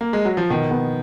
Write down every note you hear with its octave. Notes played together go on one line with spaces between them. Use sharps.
A#3
G#3
F#3
F3
B2 D#3
B3